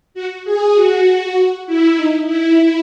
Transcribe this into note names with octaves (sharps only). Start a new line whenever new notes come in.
F#4
G#4
F#4
E4
D#4
E4